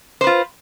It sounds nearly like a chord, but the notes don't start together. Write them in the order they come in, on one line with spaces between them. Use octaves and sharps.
C5 B4 F4